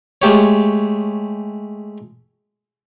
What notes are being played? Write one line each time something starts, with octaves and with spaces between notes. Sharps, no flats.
G#3 A3 G4 C#5